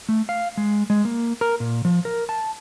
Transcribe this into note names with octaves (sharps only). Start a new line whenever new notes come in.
A3
F5
G#3
G#3
A#3
A#4
A#2
F3
A#4
A5